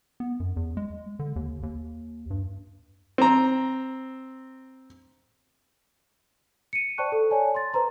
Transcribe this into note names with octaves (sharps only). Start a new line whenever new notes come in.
B3
F#2
E2
G#3
D3
D#2
D#2
G2
C4 A#5
C#7 D#7
C5 D5 G5 A5 C#6 F#6
A4
C#5 D5 G#5 A5
C6 A6
B4 C5 A#5 C6